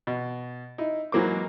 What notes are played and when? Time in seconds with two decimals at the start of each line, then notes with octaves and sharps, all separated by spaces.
0.07 B2
0.78 D#4 E4
1.12 G#2 E3 F#3 A#3 C5 D6